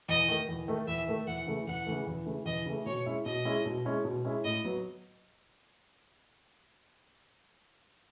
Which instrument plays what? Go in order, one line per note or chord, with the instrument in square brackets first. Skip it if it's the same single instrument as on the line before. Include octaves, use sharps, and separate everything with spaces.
[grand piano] E2 [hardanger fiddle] D#5
[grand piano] D#3 A3
E2
D#3 A3
[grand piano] E2 [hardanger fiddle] E5
[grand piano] D#3 A3
[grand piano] E2 [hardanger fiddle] F#5
[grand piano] C#3 E3 A3
[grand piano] E2 [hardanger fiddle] F#5
[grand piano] C#3 E3 A3
E2
C#3 E3 A3
[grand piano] E2 [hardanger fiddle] D#5
[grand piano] C#3 E3 A3
[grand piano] B2 [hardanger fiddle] C#5
[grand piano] G#3 C#4 E4
[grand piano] B2 [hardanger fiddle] D#5
[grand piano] G#3 C#4 E4
B2
G#3 C#4 E4
B2
G#3 C#4 E4
[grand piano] A2 [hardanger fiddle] D#5
[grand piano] F#3 B3